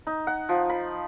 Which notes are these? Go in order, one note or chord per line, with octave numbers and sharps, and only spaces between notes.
D#4
F#5
F3
B5